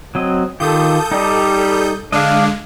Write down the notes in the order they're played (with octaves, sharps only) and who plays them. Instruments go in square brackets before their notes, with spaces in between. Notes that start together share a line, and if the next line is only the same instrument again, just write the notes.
[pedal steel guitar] F#3 C4 D#5
[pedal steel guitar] D#3 F4 G4 [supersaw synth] A4 D#6 G6
[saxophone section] G3 [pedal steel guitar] D#4 G4 D#5
[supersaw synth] D3 G#3 [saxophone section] D4 [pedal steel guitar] D#5 F5